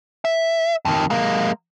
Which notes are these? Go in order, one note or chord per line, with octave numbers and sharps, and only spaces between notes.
E5
F2 D#3
G#3 A#3